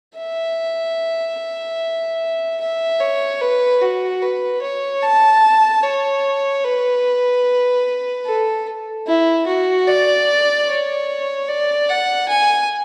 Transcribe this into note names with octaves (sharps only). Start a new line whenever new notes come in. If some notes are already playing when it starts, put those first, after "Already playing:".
E5
E5
C#5
B4
F#4
B4
C#5
A5
C#5
B4
A4
E4
F#4
D5
C#5
D5
F#5
G#5